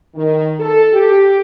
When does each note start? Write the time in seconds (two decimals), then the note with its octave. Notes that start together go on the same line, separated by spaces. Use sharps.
0.14 D#3
0.60 A4
0.93 G4